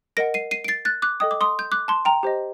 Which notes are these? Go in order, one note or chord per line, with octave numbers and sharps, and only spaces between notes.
A#4 D#5 F#5 A#6 D7
C7 D#7
C7 D#7
D7
A6 C7
F#6 A6
D6 F#6
A4 D#5 G5 D#6
D6
C6 D#6
G6
D6 F#6
A5 C6
G5 A#5
G4 C5 D#5